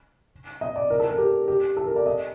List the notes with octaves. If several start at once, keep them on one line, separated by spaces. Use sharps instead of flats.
D#5
D5
A#4
A4
A#4
G4
G4
A4
A#4
D5
D#5